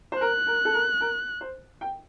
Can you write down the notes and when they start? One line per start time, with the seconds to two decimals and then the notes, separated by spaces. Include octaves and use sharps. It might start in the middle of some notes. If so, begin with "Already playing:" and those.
0.12 C5
0.20 A#4 F#6
0.47 A#4
0.65 A4
0.74 A#4
1.01 A#4
1.41 C5
1.81 G5